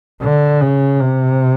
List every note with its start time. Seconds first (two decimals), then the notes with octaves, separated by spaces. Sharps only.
0.22 D3
0.61 C#3
1.00 C3